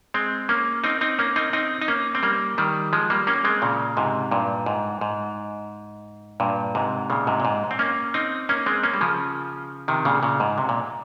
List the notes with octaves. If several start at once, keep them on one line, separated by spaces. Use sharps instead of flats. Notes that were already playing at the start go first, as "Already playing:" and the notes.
G#3 C4
A#3 C#4
C4 D#4
C4 D#4
A#3 C#4
C4 D#4
C4 D#4
D#4
A#3 C#4
C4
G3 A#3
D#3 G3
F3 G#3
G3 A#3
A#3 C#4
G#3 C4
A#2 C#3
G#2 C3
G2 A#2
G#2
G#2
G2 A#2
G#2 C3
A#2 C#3
G#2 C3
A#2
G#2
C4
A#3 C#4
C4 D#4
A#3 C#4
G#3 C4
A#3 C#4
G3
C#3 F3
C3 D#3
A#2 C#3
A#2 C#3
G#2
C3
A#2